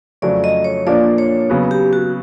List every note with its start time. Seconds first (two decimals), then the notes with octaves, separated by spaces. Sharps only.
0.22 F2 C#3 F#3 A3 D5
0.44 D#5
0.64 C#5
0.86 A#2 F3 A#3 D4 D5
1.18 C#5
1.50 C#3 F#3 B3
1.71 G4
1.93 F#4